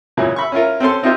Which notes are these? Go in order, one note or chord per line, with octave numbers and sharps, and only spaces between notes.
A#2 C#3 E3 F#3
E5 B5 C#6
C#4 E4 F4 A#4
C4 C#4 A4 C6
C4 D#4 F4 G4 C5 E5